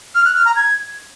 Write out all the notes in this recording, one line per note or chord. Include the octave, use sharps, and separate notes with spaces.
F6
F#6
F6
A#5
G#6